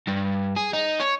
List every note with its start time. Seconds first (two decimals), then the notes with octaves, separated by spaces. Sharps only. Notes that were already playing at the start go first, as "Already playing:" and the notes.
0.08 G2
0.56 G#4
0.73 D#4
1.00 C#5